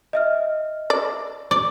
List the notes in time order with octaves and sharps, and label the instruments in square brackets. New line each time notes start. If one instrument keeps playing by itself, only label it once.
[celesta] D#5 E5 F6
[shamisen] D5
[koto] D5